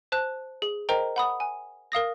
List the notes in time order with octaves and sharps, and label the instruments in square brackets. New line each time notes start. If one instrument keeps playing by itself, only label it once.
[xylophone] C5 A5 F#6
G#4
A#4 C5 D#5 G5 A#5
F#5 B5 D#6
G#5
A#4 F5 D#6 A#6